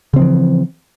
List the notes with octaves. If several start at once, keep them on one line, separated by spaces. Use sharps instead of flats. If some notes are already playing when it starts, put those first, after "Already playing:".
C#3 E3 F3 C4